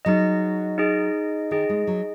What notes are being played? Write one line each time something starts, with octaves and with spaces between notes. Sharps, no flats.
F#3 D#4 G#4 D#5
D#4 G#4 D#5
D#3 D#4 G#4 D#5
G#3
F#3